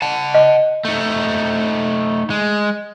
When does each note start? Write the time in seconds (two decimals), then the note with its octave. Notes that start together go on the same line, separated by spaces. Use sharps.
0.02 F#5 A5
0.35 D#5
0.85 A3 D#4
2.30 G#3